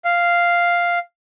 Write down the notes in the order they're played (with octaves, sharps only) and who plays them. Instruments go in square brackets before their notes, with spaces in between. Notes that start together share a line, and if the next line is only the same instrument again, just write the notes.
[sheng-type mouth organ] F5